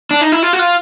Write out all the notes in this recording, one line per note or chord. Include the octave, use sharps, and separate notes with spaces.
D4
D#4
E4
F4
F#4
F4